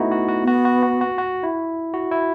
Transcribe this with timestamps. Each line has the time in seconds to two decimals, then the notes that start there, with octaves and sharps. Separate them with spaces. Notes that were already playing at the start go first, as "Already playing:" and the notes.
Already playing: A3 B3 D#4 E4 F#4
0.12 F#4
0.29 F#4
0.43 B3 F#4
0.65 F#4
0.83 F#4
1.01 F#4
1.18 F#4
1.43 E4
1.94 F#4
2.11 E4